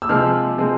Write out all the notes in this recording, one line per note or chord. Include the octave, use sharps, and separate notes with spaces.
E6
C3 F3 G#3 C4 F6
C3 F3 G#3 C4